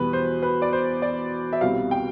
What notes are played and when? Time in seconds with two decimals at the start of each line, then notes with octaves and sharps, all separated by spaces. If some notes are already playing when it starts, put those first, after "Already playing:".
Already playing: E2 B2 G3 B4
0.13 C5
0.43 B4
0.62 D5
0.73 C5
1.02 D5
1.53 E5
1.61 C2 B2 G3 C4 F5
1.91 G5